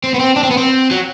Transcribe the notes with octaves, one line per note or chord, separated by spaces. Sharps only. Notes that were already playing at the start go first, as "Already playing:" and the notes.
C4
B3
C4
D4
C4
B3
C4
F#3